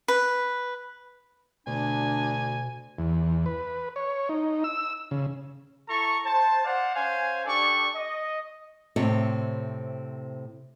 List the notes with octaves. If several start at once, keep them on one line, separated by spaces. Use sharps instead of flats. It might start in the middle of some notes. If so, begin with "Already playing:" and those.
B4
D2 B2 D4 G#5
E2
B4
C#5
D#4
E6
C#3
E4 A4 A#5 C#6
C5 A5
C5 D5 F5 F#5
C#4 C5 F5 G#5
D4 G4 A4 D5 C#6
D#5
A2 C3 C4 C#5